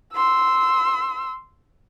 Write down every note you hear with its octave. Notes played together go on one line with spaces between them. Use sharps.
C6 E6